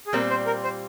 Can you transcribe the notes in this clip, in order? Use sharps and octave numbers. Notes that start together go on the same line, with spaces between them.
G#4
A#2 G3 C4 A#4
C5
A#4
C5